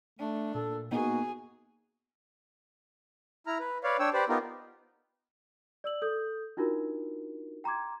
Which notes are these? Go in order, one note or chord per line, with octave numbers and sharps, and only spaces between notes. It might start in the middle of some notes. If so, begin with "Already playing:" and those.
A3 D4
A#2 A4
A#3 B3 D#4 F#4 G#4
E4 A#5 F6
B4
B4 C#5 D5 F5
D4 C#5 G5 E6
G4 B4 C5 D5
B3 D#4 F4 G4 A#4
D5 E6 F#7
A4 D#6 G6
D4 D#4 F4 F#4 A#4
G5 A#5 C6 D6 G#6